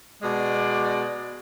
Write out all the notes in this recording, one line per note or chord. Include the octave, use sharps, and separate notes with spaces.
B2 G#3 D5